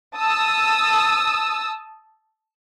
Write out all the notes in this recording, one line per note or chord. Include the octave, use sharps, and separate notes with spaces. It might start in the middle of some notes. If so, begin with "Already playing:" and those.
A5 D#6 E6